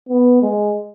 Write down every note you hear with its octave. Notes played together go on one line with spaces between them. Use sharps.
B3
G#3